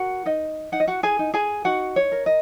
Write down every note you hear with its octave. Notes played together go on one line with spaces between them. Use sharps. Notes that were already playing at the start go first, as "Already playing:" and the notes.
Already playing: F#4 A#4 F#5
D#4 D#5
D#4 F#5
D#5
F#4 F#5
G#4 G#5
D#4
G#4 G#5
D#4 F#4 F#5
C#5
A#4
D#5